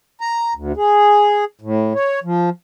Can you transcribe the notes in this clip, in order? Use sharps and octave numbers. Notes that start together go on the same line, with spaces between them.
A#5
D2
G#4
A2
C#5
F3